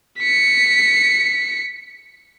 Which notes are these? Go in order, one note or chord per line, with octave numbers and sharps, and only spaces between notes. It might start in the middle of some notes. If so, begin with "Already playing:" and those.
B6 C#7